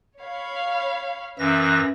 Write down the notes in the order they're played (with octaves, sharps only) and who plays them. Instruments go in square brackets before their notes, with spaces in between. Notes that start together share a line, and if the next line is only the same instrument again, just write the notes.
[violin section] C#5 F5 B5
[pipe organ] F#2 E3 A#6 [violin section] E5